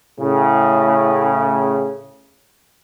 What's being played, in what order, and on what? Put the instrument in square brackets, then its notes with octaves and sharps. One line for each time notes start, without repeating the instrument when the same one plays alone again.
[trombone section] A2 C#3